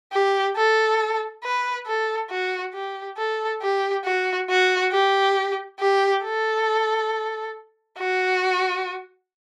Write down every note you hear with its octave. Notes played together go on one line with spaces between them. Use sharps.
G4
A4
B4
A4
F#4
G4
A4
G4
F#4
F#4
G4
G4
A4
F#4